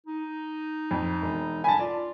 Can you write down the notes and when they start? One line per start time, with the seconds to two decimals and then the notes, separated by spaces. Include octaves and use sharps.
0.06 D#4
0.91 F2
1.22 E1
1.64 G#5 A5 B5
1.79 F4 D5